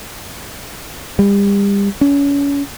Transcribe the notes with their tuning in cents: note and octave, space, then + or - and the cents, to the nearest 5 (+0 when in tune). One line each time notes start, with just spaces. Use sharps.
G3 +35
C#4 +30